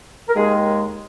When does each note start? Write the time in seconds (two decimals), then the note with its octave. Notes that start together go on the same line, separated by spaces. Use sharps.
0.28 A#4
0.35 D#2 D#3 G#3 G#4